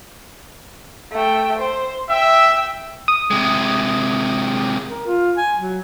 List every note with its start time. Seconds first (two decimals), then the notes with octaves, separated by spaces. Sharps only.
1.12 A3 G5
1.58 C5
2.10 E5 G5 E6
3.08 D#6
3.31 C3 G#3
4.88 A#4
5.06 F4
5.37 G#5
5.57 F#3